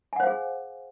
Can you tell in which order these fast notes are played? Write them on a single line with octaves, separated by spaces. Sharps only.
G#5 F#5 C5 F5 G#4